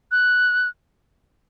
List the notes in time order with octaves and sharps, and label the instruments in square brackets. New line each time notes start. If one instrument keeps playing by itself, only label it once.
[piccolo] F#6